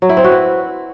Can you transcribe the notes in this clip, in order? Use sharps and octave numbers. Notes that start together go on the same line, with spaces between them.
F#3
E4
C4
F#4
B4